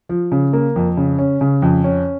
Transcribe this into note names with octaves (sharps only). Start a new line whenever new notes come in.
F3
C#3
A#3
F2
C#3
C#4
C#3
F2
C#4